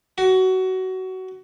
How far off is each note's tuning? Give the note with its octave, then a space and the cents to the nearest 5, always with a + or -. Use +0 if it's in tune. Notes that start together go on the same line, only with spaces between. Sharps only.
F#4 +20